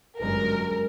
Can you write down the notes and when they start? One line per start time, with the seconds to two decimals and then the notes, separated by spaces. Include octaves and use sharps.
0.19 G1 F#2 G#3 A#4